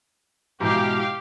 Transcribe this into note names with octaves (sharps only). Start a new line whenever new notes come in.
G#2 B2 E3 G4 F5